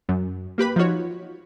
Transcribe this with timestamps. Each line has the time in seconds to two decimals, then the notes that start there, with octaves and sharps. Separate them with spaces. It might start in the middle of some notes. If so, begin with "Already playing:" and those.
0.09 F#2
0.58 A#3 G4 B4 B5
0.76 F3 D#4 F4 F#4 C#5